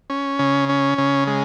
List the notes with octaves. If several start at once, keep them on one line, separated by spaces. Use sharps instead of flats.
C#4
C#3
C#4
C#3
G#3